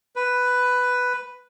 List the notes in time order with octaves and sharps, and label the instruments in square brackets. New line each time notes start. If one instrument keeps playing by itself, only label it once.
[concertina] B4